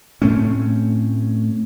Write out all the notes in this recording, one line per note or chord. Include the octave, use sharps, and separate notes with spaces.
A2 A3 C4 C#4